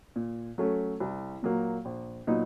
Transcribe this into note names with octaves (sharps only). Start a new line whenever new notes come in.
A#2
F#3 A3 C#4
C2
A#2 F#3 A#3
A#1
A#2 F#3 B3 D#4